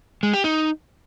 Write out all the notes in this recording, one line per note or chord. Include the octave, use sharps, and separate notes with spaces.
G#3
G4
D#4